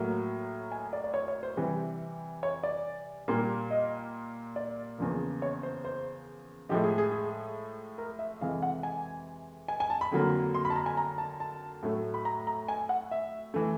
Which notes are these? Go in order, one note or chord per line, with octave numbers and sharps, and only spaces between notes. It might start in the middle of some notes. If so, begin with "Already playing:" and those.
Already playing: A2 F#3 A#3
G#5
D5
D5
C#5
C#5
C5
C3 E3 G3 B4
C#5
D5
A#2 G3 A#3
D#5
D5
E2 C#3 F3 A#3
C#5
C5
C5
A2 F3 G#3 G4
G#4
G#4
G#4
A#4
E5
F2 C3 E3 G#3 F5
F#5
G#5
G#5
G#5
A5
B5
F2 D3 F#3 A#3
C6
B5
A5
A#5
G#5
A#5
A5
A5
A2 F#3 A3
B5
A#5
A#5
G#5
F#5
E5
E3 A3